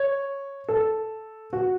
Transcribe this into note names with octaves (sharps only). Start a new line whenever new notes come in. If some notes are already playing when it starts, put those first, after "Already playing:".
Already playing: C#5
A4
F#4